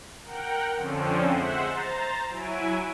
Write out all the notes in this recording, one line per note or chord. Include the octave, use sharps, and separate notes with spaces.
A#4 F#5 G5
F2 D3 F3 C4 C#4
G#3 C5 E5 F#5
C5 A#5 A6
F#3 E4 G#5 D7